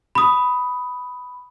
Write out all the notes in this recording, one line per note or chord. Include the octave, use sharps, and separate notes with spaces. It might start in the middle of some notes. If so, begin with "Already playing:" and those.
B5 D#6